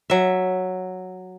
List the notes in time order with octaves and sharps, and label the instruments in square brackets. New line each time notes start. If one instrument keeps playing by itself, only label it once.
[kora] F#3 E5